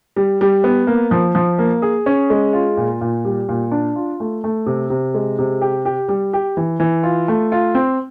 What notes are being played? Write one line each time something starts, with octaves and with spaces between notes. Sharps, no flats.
G3
G3
B3
A#3
F3
F3
A#3
G#4
C#4
G#3
F4
A#2
A#2
G3
A#2
D4
F4
A3
A3
C3
C3
G#3
C3
G4
G4
G3
G4
E3
E3
F4
A3
F4
C4